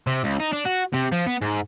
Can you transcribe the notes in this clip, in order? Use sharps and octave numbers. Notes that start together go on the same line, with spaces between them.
C3
C#2
D#4
D4
F#4
C3
F3
B3
G#2